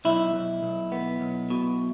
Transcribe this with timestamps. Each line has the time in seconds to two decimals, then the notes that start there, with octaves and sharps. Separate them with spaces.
0.05 B1 E4
0.34 B1
0.63 B1
0.92 B3
1.21 B1
1.50 B2